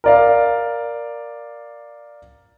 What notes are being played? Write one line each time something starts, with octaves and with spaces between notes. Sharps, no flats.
A#4 D5 F5